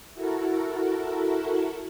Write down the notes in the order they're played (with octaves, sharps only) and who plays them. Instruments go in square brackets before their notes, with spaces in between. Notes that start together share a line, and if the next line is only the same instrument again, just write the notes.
[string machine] E4 F#4 A4 A#4